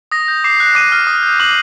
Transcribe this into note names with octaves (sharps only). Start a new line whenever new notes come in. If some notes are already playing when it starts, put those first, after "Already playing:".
D#6 A#6
G6
D6 C7
F#6
D6 D#7
F6
D#6
G6
D6 F#7